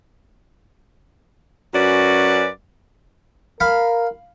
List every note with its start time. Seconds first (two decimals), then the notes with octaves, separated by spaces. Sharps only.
1.74 F#2 C#4 F#4 B4 D5
3.60 A#4 F5 B5